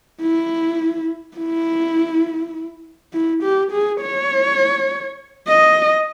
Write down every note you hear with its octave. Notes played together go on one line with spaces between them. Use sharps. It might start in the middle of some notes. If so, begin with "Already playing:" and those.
E4
E4
E4
G4
G#4
C#5
D#5